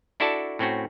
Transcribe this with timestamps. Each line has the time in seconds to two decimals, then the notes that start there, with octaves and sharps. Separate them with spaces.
0.20 D4 E4 F#4 A4 D5 A5
0.59 A2 C4 C#4 F#4